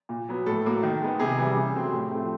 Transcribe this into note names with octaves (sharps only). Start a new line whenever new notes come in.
A#2
F#3 B3
A2 A4
F#3 A#3
D#3
G#3 B3
C3 G#4
E3 G3
C#3
F#3 A3 C4
A2 G4
F3 A3 C4